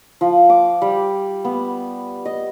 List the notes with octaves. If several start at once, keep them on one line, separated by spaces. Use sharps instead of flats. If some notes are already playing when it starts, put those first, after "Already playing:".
F3
D6
G3
B3
D#5